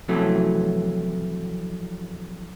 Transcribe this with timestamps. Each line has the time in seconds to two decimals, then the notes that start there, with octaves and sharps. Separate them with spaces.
0.08 F2 C3 E3 F#3 A3 C#4